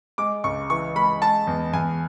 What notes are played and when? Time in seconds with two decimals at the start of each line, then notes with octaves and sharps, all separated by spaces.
0.18 G#3 D6
0.44 C#2 C#6
0.70 E3 C#6
0.96 G#3 B5
1.22 G#3 A5
1.47 E2
1.73 E2 G#5